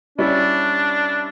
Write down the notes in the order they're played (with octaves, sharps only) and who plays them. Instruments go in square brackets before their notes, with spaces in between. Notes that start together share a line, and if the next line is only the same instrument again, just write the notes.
[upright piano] G3 C#4 E4 [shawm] D4